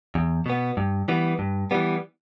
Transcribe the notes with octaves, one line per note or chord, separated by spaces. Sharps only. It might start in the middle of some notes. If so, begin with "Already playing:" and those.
E2
B2 B3
G2
E3 G3 B3
G2
E3 G3 B3